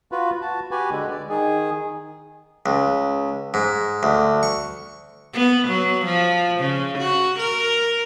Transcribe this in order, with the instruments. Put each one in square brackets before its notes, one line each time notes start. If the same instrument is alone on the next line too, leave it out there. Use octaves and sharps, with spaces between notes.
[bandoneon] F4 F#4 B4
F#4 A5
F#4 G4 B4 G#5
D3 G#3
D5
D#3 G#4
[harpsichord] C#2
G#2
D2
C#6
[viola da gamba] B3
F#3
F3
C#3
F#4
A#4